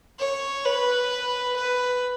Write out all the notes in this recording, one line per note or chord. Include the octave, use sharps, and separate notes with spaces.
C#5
B4
B4